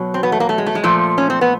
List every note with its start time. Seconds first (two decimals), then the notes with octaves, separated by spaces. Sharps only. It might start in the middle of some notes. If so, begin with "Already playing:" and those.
Already playing: B2 F#3
0.14 C4
0.23 B3
0.32 A3
0.40 A#3
0.49 A3
0.58 G#3
0.66 A3
0.75 G#3
0.84 A#2 F3 A3
1.18 C#4
1.30 C4
1.41 B3